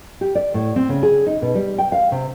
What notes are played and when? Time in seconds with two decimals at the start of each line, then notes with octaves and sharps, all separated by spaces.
0.21 G4
0.35 D5
0.54 A2
0.76 C4
0.89 C#3
1.03 G#4
1.26 D#4
1.42 B2
1.55 G3
1.78 G5
1.92 F5
2.12 C3